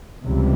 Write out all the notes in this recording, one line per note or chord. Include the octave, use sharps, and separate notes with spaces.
C#2 C3 E3 G3